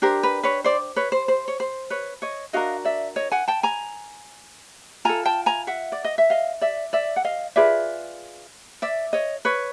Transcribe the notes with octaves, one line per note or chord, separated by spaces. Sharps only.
D4 G4 A#4 C5
B4
B4 C#5
C5 D5
B4 C#5
C5
C5
C#5
C5
B4 C#5
C#5 D#5
D4 F#4 A#4 D#5 F5
D5 E5
C#5 D#5
F#5 G#5
G5 A5
G#5 A#5
F4 A4 G#5 A#5
G5 A5
G#5 A#5
E5 F#5
D5
D#5
E5
D#5 F5
D5 E5
D5 E5
F#5
D#5 F5
F4 G#4 B4 D5 E5
D5 E5
C#5 D#5
B4 C#5